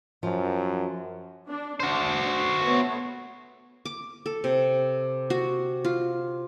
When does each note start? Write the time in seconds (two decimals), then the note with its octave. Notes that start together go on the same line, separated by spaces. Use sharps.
0.23 F#2 F3
1.49 D4
1.80 D4 F#4 C5
2.59 A3 B3 C#5
3.85 D6
4.26 A4
4.44 C3
5.30 F#4
5.84 F4